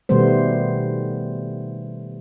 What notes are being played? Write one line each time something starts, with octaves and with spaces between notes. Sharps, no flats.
B2 D#3 G3 A3 B3 C5